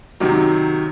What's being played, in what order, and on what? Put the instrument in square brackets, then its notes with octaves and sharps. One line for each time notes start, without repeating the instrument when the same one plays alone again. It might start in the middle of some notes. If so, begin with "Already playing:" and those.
[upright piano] F#2 C3 D#3 F#3